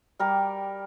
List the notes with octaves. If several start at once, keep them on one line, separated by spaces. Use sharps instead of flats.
G3 A#4 G5 D6